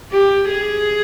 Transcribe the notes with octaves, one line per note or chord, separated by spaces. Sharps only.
G4
G#4